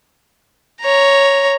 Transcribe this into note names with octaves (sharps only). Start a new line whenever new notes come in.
C#5 A#5